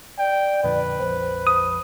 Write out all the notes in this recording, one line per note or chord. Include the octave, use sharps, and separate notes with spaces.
D5 G5
F2 A#2 D3 B4
A#1 F2 C5
D#6